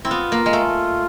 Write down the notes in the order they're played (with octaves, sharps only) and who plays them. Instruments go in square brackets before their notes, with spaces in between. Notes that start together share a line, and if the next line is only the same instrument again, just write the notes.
[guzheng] C4 [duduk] E4
[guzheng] B3 [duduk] F4
[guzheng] A#3
G#3
A3